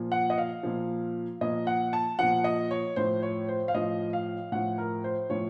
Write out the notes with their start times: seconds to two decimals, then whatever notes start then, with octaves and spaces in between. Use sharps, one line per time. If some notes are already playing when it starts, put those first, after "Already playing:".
Already playing: A#2 F3
0.12 F#5
0.30 D#5
0.38 F5
0.63 A#2 F3
1.41 A#2 F3 D#5
1.67 F#5
1.93 A5
2.19 A#2 F3 F#5
2.44 D#5
2.71 C#5
2.96 A2 F3 C5
3.23 C#5
3.48 C5
3.68 F5
3.74 A2 F3 D#5
4.13 F5
4.52 A2 F3 F#5
4.78 A#4
5.04 C5
5.30 A2 F3 C#5